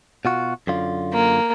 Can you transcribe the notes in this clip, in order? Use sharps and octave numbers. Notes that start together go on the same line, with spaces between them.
B2 F4 F#4
F#2 D3 F4
A#3